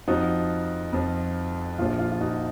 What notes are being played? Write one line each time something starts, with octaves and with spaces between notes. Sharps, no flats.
F2 F3 D#4 F#4
F2 F3
A#1 A#2 F3 F4
F4
F4
D#4 F#4